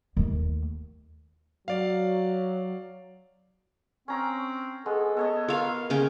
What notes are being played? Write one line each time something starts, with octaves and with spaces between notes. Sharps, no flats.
D#2 A3
F#3 D5 F5
C4 C#4 A#5 C#6
G#3 B3 A4
B3 A4 C#5 D#5
F4 A4 A#4 F5
C#3 C#4 G5